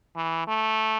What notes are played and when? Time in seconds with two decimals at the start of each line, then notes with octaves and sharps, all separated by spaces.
0.16 E3
0.47 A3